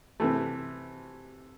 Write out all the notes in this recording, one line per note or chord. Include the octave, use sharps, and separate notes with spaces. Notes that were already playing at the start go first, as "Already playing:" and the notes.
C3 E3 A3